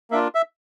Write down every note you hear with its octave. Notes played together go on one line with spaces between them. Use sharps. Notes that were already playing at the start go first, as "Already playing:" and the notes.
A#3 D4 F4 E5
E5